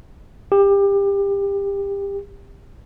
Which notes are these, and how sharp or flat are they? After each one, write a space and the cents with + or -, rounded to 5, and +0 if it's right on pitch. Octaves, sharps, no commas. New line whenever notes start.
G4 +25